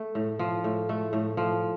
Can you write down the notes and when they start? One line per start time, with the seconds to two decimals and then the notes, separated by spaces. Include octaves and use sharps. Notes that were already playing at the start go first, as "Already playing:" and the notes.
Already playing: A3
0.15 A2
0.39 F3
0.64 A2
0.89 A3
1.13 A2
1.37 F3